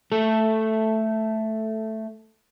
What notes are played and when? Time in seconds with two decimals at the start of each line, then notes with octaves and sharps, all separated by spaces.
0.12 A3 A4